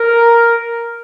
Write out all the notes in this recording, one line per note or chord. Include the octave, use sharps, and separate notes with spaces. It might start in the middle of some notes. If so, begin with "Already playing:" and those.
Already playing: A#4